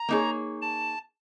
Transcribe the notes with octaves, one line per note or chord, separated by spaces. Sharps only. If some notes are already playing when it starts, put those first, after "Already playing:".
Already playing: A#5
A#3 D#4 G#4 C#5
A5